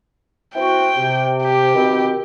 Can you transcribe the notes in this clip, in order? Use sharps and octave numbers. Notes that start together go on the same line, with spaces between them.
C4 E4 F#4 G5
C3
G4
B2 D#3 C4